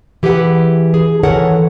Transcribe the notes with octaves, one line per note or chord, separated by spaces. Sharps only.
E3 G4 G#4 B4 F#5
G#4
D#3 E3 A4 A#4 C#5 F#5